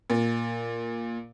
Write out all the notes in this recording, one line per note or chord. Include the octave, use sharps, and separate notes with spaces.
A#2